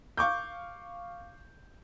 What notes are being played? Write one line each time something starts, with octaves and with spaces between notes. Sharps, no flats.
F5 C#6 D6 G6